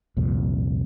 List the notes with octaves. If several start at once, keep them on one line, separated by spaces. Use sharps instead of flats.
C2 F2 A#2